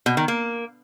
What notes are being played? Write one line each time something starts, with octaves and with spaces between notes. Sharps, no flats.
B2
D#3
A#3